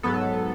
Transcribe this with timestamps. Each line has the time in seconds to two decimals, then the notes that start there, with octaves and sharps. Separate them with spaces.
0.03 G#2 F#3 B3 A4